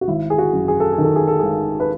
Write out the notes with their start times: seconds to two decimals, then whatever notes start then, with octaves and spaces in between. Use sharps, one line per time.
0.01 F#4
0.08 G#1 E4
0.30 G#4
0.38 F#4
0.53 F#2
0.68 G#4
0.80 A4
0.92 G#4
0.98 D#3
1.04 A4
1.16 G#4
1.28 A4
1.39 G#1 G#4
1.80 B4